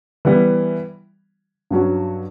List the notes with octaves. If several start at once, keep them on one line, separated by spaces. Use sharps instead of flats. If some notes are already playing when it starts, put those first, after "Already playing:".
E3 G3 B3 E4
G2 F#3 C#4 F#4